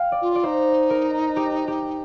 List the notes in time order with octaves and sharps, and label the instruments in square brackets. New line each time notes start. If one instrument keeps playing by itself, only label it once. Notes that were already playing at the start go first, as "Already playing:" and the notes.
Already playing: [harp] F5 G5
D5
[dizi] F4
[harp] D5
[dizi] D#4 [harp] C5
[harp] A#4
G4
G4